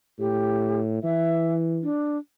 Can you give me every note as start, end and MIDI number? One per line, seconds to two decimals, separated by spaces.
0.19 1.01 45
0.19 0.81 67
1.03 1.86 52
1.03 1.54 76
1.83 2.18 62